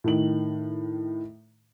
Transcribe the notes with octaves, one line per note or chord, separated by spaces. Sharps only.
A2 D#3 F#7